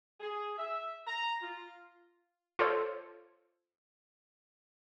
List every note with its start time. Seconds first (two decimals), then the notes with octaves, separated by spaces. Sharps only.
0.21 G#4
0.58 E5
1.06 A#5
1.42 F4
2.59 F4 A4 C5 C#5